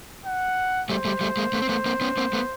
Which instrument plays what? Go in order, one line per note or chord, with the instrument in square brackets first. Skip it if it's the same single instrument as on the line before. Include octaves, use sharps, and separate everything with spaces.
[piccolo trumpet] F#5
[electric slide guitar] G3 A3 [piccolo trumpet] C5
[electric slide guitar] G3 A3
G3 A3
G#3 A#3
A3 B3
C4
A3 B3
A#3 C4
B3 C#4
A#3 C4
A3 B3